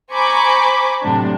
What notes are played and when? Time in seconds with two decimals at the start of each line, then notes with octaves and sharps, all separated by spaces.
0.13 C5 G#5 A#5 B5 C#6 D6
1.02 A2 C3 F#3 D4